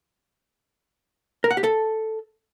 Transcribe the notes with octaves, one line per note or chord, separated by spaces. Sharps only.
A#4
F#5
G4
A4